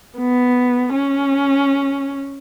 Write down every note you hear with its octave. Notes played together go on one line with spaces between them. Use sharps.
B3
C#4